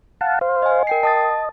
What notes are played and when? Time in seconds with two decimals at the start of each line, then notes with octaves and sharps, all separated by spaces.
0.21 F5 F#5 A5
0.41 C5 F5
0.62 D#5 G#5
0.87 A#4 G5 C7
1.03 D#5 A5 D#6 A6